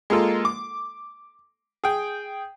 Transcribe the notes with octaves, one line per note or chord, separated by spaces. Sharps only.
G#3 A#3 F4 A4
D6
G#4 G5